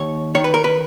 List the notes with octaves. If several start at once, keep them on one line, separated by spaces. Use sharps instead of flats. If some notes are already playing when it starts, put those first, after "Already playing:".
Already playing: D#2 C#5
D#3 C#5
B4
A#4
B4